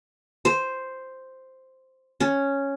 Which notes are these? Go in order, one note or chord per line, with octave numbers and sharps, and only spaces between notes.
C5
C#4